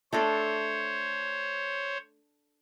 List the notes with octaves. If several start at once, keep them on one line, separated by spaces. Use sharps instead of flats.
A3 D4 A4 C5 C#5